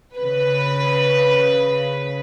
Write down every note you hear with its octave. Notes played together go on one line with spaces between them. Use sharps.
C#3 B4